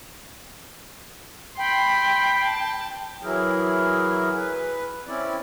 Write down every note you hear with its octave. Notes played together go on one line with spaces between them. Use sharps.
G5 B5 C6
A5
E3 F#3 E4 G#4 A#4
B4
C4 C#4 E4 D5